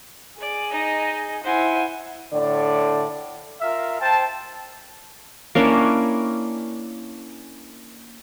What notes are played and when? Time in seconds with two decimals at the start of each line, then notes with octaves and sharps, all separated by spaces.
0.41 G#4 D5
0.71 D#4 D#5
1.44 E4 C5 F#5 G#5
2.33 A2 D3 D5
3.62 F4 A#4 E5 F5
4.00 C5 G5 A5
5.55 A#3 C#4 D4 E4